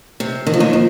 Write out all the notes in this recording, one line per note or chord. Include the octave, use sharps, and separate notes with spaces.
C3
D#3
F3
D#2 D#3
F3